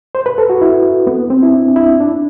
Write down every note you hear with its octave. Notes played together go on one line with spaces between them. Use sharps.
C5
B4
A4
F#4
E4
B3
C4
E4
D4
E4
D4